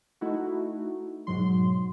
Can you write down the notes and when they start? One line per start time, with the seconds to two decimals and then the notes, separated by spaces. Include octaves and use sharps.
0.21 A3 D#4 E4 F#4
1.27 G#2 B2 F#3 C6